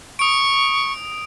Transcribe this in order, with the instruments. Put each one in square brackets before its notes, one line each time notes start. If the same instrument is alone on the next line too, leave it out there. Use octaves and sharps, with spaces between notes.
[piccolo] C#6 [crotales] D#6 D7